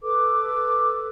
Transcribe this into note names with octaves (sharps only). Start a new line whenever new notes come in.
A4 B4 D6